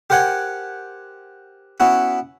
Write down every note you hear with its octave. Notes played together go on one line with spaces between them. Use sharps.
G4 A#4 C5 F#5 G#5
B3 C#4 E4 F#4